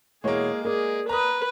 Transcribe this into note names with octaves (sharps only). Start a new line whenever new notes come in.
E2 B2 G#3 A#3 G#4 C#5
G#4 A#4 D5
B4 A#5 D#6